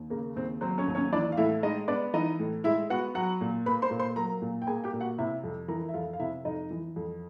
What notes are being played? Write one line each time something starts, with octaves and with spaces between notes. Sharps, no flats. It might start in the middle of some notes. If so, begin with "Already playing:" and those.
Already playing: D#2
C#3 A#3 A#4
D#2 C4 C5
F#3 C4 C5
C#4 C#5
D#2
C#4 C#5
E3 D4 D5
F5
A2 E4 E5
G#3 D#4 D#5
B3 D4 D5
E3 D#4 D#5
A2
G#3 E4 E5
B3 F#4 F#5
F#3 F#4 F#5
A#2
A#3 B4 B5
C5 C6
A#2
C5 C6
F#3 A#4 A#5
A#2
G5
A#3 G#4 G#5
G4 G5
A#2
F#4 F#5
C3 E4 E5
F2
E3 A#4 A#5
E5
F2 F4 F5
F5
C3 E4 E5
F2 D#4 D#5
E3
F2